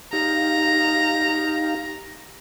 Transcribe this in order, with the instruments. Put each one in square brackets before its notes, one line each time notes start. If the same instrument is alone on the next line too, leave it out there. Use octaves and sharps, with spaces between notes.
[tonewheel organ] D#4 G4 F5 [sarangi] A#5